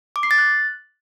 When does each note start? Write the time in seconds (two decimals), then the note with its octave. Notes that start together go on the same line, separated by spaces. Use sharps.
0.16 D6
0.23 C7
0.31 A6
0.38 F#6